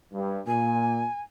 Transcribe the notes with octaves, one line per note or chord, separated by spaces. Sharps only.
G2
A#2 G#5